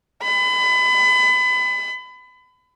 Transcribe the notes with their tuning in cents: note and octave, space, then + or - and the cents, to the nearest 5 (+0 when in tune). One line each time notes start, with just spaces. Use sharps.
B5 +30